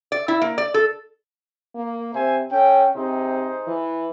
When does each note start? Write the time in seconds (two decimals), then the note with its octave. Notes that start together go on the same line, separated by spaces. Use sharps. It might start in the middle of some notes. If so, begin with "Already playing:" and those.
0.12 D5
0.28 E4
0.41 A#3
0.58 D5
0.74 A4
1.75 A#3
2.15 C3 C5 E5 G#5
2.52 C#4 A4 G5
2.95 C3 D#4 G#4 C5
3.67 E3